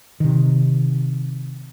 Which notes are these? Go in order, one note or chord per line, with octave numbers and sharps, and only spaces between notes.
C3 D#3